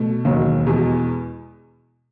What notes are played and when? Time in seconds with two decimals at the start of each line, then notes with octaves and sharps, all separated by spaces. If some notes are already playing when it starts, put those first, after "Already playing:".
Already playing: B2 A3
0.25 E1 D#2 D#3 F#3
0.67 E2 B2 G#3